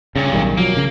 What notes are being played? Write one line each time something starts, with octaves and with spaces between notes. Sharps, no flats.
G2 A#2 C#3
B1 D#3 G3
F3 F#3 A#3
C#3